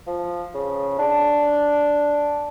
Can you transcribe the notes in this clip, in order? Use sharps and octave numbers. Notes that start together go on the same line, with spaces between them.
F3
C#3
D4